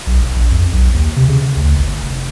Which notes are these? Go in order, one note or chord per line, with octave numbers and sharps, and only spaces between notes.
B1
E1
A#1
F2
B1
D#2
C3
C#3
D2
G1
F1